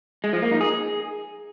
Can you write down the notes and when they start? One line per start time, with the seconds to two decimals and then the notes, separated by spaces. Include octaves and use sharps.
0.24 G#3
0.33 F3
0.42 A#3
0.51 D#4
0.61 G#4